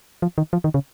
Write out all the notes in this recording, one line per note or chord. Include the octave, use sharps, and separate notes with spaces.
F3
D#3
F3
D#3
C#3